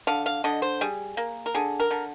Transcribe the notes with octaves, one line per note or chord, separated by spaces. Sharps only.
D3 F5
F5
D3 D#5
C5
G3 G#4
A#3
A#4
D3 G#4
A#4
D3